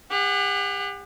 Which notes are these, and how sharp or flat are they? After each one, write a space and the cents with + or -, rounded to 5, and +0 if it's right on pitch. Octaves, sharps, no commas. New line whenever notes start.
G4 +40 F#5 +0